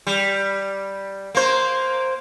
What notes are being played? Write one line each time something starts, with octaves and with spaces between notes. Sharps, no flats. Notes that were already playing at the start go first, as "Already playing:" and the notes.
G3
A#3 C5